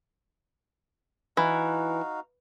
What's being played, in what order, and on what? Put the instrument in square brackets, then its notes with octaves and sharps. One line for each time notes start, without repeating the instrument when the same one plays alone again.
[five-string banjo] E3 [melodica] D#4 F#4 F5